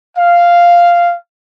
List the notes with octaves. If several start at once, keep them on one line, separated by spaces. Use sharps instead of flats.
F5